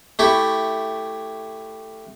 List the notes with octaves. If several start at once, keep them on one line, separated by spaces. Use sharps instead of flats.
A3 E4 G4 C#6